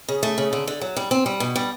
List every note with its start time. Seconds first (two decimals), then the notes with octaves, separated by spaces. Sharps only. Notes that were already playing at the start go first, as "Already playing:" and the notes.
0.08 C#3
0.23 A3
0.38 C#3
0.53 D3
0.67 D3
0.81 F#3
0.97 G3
1.11 C4
1.26 G3
1.40 B2
1.56 G3